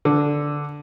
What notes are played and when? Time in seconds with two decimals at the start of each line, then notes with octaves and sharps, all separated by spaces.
0.05 D3